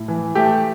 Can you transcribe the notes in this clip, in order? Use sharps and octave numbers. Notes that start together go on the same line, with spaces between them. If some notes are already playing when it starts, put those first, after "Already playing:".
Already playing: A2
E3
A3 G4